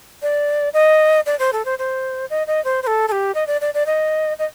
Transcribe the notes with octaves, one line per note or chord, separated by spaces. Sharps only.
D5
D#5
D5
C5
A4
C5
C5
D#5
D#5
C5
C5
A4
A4
G4
D#5
D5
D5
D5
D#5
D#5